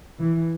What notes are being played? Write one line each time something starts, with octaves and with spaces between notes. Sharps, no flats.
E3